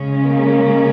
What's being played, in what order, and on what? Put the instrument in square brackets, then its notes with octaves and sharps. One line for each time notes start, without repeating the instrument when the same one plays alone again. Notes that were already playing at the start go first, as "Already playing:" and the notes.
Already playing: [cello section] C#3 G#3 C#4
[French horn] A#3